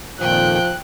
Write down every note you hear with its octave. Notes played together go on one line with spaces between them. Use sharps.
F2 A#2 D#3 F3 G5 F#6